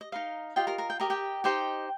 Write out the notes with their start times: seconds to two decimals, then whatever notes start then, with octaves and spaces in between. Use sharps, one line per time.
0.01 D#5
0.12 D#4 A#4 D#5 F5
0.56 F4 G4 D#5 G5
0.67 A#4 A#5
0.78 A#4 A#5
0.90 G5
1.00 G4 A#4 D#5 A#5
1.10 G4 G5
1.44 D#4 G4 C5 D#5 G5